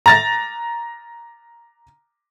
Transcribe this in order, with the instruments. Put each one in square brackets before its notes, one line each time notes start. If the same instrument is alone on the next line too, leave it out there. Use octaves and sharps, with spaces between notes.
[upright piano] A#5 A6 A#6